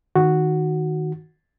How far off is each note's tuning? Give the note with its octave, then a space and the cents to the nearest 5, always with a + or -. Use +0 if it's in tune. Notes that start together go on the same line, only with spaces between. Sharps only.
D#3 +0 F#4 +0